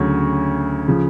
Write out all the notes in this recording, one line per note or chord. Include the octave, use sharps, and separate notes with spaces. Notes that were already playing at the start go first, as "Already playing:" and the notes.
Already playing: D2 C#3 F#3 C#4
C#3 F3